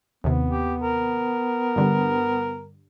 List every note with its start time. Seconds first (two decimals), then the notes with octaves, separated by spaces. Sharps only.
0.24 D#2 C3 B3
0.50 G4
0.83 A#4
1.76 G2 D3 G3